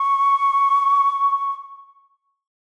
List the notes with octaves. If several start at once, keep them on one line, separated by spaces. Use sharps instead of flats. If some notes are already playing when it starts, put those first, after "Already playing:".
Already playing: C#6